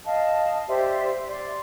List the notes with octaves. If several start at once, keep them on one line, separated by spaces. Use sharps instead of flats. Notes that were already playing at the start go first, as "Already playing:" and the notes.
D#5 F5 A5
G4 C5 D5 E5
D5 C6